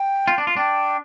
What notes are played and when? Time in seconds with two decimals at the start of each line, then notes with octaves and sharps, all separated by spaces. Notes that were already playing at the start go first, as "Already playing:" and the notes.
Already playing: G5
0.28 F4
0.38 D4
0.47 F4
0.57 D4 G5